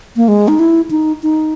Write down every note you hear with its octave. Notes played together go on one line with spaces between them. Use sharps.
A#3
G#3
D#4
E4
D#4
D#4